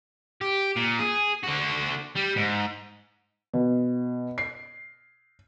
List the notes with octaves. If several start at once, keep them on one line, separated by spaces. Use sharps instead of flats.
G4
A#2
G#4
D3 F#4
G3
G#2
B2
C7